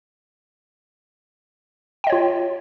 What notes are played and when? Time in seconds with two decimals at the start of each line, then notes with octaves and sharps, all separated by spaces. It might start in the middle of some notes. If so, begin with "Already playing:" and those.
2.04 G5
2.07 D#5
2.10 C#5
2.12 F4